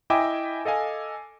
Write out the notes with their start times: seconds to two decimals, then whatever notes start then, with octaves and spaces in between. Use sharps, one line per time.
0.10 E4 D#5 E5 G5 G#5 D6
0.65 A4 D#5 F5 G#5